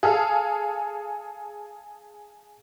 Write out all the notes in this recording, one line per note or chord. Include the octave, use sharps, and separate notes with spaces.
G#4 A4 F5